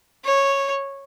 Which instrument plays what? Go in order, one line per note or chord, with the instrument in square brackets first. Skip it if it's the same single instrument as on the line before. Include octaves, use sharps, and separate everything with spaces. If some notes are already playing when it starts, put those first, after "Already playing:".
[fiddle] C#5